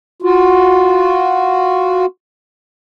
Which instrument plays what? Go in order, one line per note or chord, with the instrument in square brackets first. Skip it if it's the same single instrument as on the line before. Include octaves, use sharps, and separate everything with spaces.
[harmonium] F4 F#4